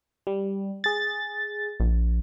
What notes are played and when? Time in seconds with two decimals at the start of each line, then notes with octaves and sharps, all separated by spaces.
0.27 G3
0.84 G#4 A6
1.80 A#1